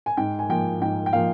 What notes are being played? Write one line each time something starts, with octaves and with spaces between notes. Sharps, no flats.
G#5
G#2 G5
G#5
F3 A#3 G5
G#2 G5
G5
F3 A#3 F5